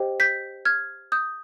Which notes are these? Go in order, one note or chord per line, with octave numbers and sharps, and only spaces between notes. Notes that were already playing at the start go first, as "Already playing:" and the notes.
Already playing: G4 C5 D#5 G5
G6 B6
F6 G#6
D#6 G6